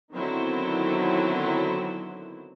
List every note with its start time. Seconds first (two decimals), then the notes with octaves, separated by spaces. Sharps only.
0.13 D3 D#3 F#3 B3 C4 E4